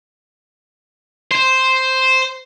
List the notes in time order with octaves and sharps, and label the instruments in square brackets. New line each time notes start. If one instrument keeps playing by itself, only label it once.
[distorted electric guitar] C5